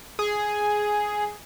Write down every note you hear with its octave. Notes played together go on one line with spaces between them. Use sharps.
G#4